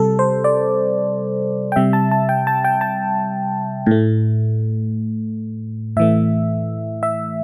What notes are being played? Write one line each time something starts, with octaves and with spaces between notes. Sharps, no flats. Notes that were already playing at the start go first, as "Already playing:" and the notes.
Already playing: C3 G3 A4
C5
D5
G5
C3 G3 E5
A5
A5
G5
A5
G5
A5
A2 A3
A2 E3 A3 E5
E5